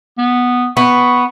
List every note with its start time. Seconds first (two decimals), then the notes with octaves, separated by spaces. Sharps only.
0.18 B3
0.77 B3 C#6